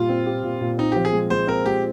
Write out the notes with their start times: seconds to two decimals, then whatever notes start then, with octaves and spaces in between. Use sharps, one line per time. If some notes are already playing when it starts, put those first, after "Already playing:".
Already playing: A#2 G3 F4
0.09 C4
0.26 G4
0.44 A#2
0.61 A#2
0.78 C4 D#4
0.92 F3 G4
1.05 G#4
1.13 G#3
1.30 G#3 C5
1.47 C4 A#4
1.65 G#3 G4